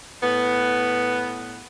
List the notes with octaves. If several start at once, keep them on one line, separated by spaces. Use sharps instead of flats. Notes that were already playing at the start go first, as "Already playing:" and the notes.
A2 B3